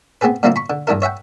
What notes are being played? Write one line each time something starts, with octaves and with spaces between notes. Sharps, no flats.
B3 C4 G4 G#4 B4
A#2 D3 G3 A#3 C4 E4
B5 C#6
D3
G2 E3 D4 E4 A#4
C#5 E5 F#5 G5